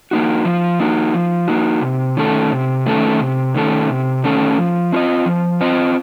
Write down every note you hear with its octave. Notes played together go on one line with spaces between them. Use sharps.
A#3 D#4 F#4
F3
A#3 D#4 F#4
F3
A#3 D#4 F#4
C3
D#3 A3 C#4 A4
C3
D#3 A3 C#4 A4
C3
D#3 A3 C#4 A4
C3
D#3 A3 C#4 A4
F3
C4 F4 C5 D#5
F3
C4 F4 C5 D#5